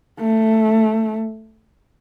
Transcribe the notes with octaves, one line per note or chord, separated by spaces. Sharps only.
A3